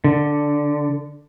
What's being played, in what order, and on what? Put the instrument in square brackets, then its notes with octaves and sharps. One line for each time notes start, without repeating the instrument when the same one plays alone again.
[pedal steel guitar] D3